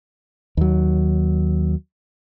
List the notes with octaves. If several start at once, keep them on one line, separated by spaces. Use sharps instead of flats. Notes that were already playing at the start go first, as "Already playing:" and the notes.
D#2 F#3